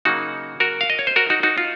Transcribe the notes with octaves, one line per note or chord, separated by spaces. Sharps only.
C#3 F#3 A#3 D#4 F#4
F#4 A#4
F5
D#5
C#5
C5
F#4 A#4
D#4 F#4
D#4 F#4
F4